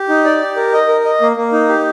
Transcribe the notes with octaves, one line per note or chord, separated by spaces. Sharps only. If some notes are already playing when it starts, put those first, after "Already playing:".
Already playing: G4
D#4
D5
G4
A#4
D#5
A#4
D#5
A#3
A#3
D#4
G4